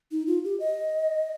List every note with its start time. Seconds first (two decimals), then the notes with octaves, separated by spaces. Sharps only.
0.12 D#4
0.27 F4
0.44 G4
0.60 D#5